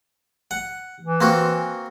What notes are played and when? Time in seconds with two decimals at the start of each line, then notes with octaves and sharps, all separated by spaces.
0.51 F#5
1.03 E3
1.21 A#3 C4 F#4